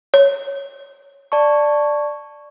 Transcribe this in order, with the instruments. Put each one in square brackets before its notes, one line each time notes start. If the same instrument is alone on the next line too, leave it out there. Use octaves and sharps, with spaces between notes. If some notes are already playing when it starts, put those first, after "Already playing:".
[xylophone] C#5
[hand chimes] D5 A5 C#6